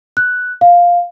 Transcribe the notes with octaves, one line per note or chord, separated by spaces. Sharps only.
F#6
F5